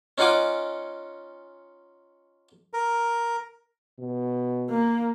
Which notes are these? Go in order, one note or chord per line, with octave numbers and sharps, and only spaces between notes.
C#4 D#4 F4 F#5 G#5 D6
A#4
B2
A#3